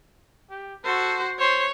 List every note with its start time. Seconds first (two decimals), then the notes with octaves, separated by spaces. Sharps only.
0.50 G4
0.85 F#4 A4 C5
1.39 C5 C#5